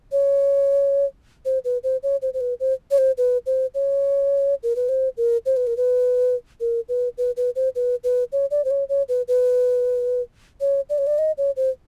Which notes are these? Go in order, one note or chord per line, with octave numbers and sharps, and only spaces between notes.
C#5
C5
B4
C5
C#5
C5
C5
B4
C5
C#5
C5
B4
C5
C#5
A#4
B4
C5
A#4
C5
B4
A#4
B4
A#4
B4
B4
B4
C5
B4
B4
C#5
D5
C5
C#5
C#5
B4
B4
C#5
D5
C#5
D5
D#5
C#5
C5